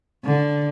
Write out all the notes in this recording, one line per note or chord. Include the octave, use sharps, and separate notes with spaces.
D3